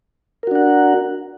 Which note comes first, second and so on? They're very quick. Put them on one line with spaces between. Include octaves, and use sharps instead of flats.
A#4 F#4 D4 F#5